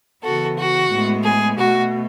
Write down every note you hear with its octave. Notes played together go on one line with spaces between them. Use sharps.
C#3 E3 B3 F#4 A4
F#4
A2 G#3 B3
G#4
B2 A3 F#4